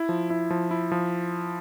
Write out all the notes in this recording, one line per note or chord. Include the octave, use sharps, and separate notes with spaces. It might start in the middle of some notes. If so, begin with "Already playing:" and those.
Already playing: E4
F3
E4
F3
E4
F3